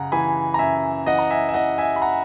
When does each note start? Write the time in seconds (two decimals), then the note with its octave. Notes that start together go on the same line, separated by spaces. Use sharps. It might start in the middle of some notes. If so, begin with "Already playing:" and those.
Already playing: F#2 C#3 F#5 A#5
0.12 E3 G#5 B5
0.54 A#5
0.59 F#2 E5 G#5
1.06 E3 D#5 F#5
1.19 A#5
1.30 E5 G#5
1.49 E5
1.54 E3 D#5 F#5
1.78 E5 G#5
1.96 B5
2.02 F#5 A#5